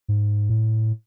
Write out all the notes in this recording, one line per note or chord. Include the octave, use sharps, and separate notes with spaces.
G#2
A2